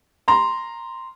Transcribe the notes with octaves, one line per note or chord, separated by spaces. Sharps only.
A#5 C6